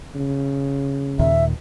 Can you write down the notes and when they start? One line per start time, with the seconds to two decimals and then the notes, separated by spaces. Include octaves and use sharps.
0.15 C#3
1.19 D#2 A#2 D#3 E5